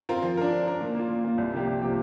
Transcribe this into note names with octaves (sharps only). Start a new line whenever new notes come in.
C4 F4 A#4
F3
D4 A#4
F3
D4 A#4
A#2
A#3 F4
A#2
A#3 F4
C2
C3 F3 A#3 G4
C2
C3 F3 A#3 G4